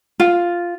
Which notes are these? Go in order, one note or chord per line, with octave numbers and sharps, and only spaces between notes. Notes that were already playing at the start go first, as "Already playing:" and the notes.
F4